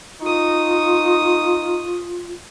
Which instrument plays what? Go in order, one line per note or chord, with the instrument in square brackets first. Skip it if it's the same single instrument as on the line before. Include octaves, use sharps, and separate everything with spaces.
[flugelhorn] D#4 [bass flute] F4 [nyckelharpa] C#6 D#6